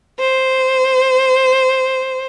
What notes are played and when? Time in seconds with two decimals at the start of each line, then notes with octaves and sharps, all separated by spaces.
0.19 C5